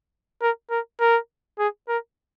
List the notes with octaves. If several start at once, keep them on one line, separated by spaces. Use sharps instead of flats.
A#4
A#4
A#4
G#4
A#4